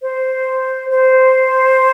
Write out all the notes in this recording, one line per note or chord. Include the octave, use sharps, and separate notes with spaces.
C5
C5